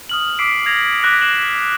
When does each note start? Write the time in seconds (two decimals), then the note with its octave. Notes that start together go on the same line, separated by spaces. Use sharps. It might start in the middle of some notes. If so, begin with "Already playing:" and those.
0.09 D#6 F6 F#7
0.39 D6 E6 B6 C7 D7
0.66 G#6 A#6 F7
1.02 D6 F#6 A#6 B6 D7
1.21 C7 E7 F#7